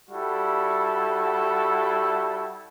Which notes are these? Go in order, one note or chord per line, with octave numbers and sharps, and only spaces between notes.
G3 E4 F#4 A4